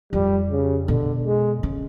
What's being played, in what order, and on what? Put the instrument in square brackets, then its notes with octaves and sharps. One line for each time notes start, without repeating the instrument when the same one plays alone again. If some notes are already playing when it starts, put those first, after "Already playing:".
[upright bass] F2 [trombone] G3
[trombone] C#3
[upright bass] B2 [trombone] D3
[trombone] G#3
[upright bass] C#3